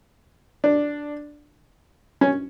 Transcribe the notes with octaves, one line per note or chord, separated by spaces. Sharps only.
D4
C#4